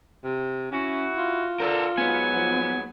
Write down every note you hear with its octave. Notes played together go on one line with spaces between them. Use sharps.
C3
C#4 E4 F#4
F4
D3 A4 A#4
G#2 F#3 B3 G#5
F3